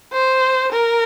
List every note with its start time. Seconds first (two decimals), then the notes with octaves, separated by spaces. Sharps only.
0.13 C5
0.72 A#4